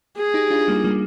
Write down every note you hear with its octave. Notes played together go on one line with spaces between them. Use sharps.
G#4
D#4 G4
D4 F4
G3 A#3
G3 A#3